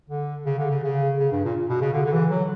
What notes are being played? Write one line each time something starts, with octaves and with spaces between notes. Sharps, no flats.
D3
C#3
D3
C#3
C#3
C#3
G2
A#2
B2
C#3
D3
D3
E3
F#3